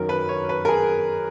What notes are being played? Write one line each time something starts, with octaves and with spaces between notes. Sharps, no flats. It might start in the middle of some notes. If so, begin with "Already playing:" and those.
Already playing: F#2 D#3 F#3 A#4
B4
C#5
B4
A#4
G#4